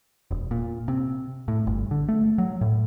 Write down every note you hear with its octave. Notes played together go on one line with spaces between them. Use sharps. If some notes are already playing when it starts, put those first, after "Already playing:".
E1
A#2
C3
A2
G1
D3
A3
F#3
A2